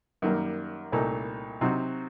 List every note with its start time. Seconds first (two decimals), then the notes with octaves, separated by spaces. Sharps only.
0.22 F#2 D#3 G3 A#3
0.92 C2 A#2 A3 D#4 A4
1.61 C3 F#3 C4 D#4 F#4